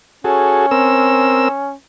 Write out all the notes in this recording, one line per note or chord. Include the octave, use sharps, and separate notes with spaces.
C#4 F#4 G#4 A4
C4 A#4 E6